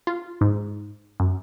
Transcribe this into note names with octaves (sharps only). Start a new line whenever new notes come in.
F4
G#2
F#2